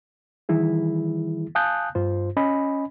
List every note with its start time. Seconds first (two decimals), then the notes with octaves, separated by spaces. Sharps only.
0.49 D#3 E3 G3 E4 G#4
1.55 F5 G#5 A5 D#6 F#6 G6
1.95 G2 F4 C5
2.37 C#4 D#5 G#5 B5